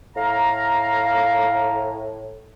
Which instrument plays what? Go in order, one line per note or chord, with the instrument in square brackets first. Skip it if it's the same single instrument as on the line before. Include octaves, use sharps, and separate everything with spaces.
[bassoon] A2 [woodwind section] F5 A#5